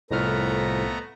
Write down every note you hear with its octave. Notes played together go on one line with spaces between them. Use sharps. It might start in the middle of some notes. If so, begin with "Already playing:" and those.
C2 F2 A2 A3 B3 A#5 F6